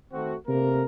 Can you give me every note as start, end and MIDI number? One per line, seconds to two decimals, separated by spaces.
0.12 0.35 51
0.12 0.35 57
0.12 0.35 60
0.12 0.35 66
0.47 0.84 48
0.47 0.84 57
0.47 0.84 58
0.47 0.84 70